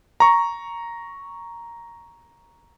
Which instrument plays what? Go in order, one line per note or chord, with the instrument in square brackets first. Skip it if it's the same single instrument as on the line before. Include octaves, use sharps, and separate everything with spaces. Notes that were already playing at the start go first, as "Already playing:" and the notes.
[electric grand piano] A#5 C#6